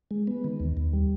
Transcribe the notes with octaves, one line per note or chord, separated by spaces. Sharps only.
G#3
B3
D#3
D#2
D#2
G3